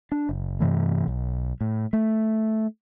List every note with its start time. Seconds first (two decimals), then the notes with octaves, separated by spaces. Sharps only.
0.12 D4
0.29 F#1
0.60 G2 C3 E3 A3
1.08 B1
1.61 A2
1.93 A3